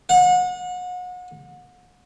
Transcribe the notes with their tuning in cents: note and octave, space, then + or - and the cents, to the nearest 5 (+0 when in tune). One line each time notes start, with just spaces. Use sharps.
F#5 -35